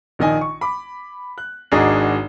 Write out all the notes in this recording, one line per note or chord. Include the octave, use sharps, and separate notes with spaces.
A#1 D#3 D#5 G#5
C#6
B5 D6
F#6
G#1 D4 F#4 G#4 D#5 A#5